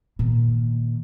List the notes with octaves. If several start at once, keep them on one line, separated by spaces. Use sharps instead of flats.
A#2 D#3